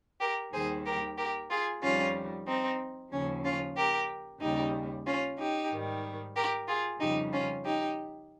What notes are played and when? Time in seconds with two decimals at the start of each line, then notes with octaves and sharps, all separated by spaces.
0.20 G4 A#4
0.53 D#2 D#3 G3 G#4 C5
0.86 G4 A#4
1.18 G4 A#4
1.50 F4 G#4
1.82 F2 D#3 G3 C#4 F4
2.47 C4 D#4
3.12 D#2 C#3 F3 C#4
3.44 C#4 F4
3.77 G4 A#4
4.41 D#2 C#3 G3 D#4 G4
5.06 C#4 F4
5.38 D#4 G4
5.72 G#2 D#3 G3
6.36 G4 A#4
6.68 F4 G#4
7.00 F2 C#3 G3 D#4 G4
7.32 C#4 F4
7.65 D#4 G4